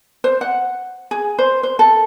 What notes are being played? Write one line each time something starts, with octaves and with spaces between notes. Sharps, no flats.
C5
F#5
G#4
C5
C5
A4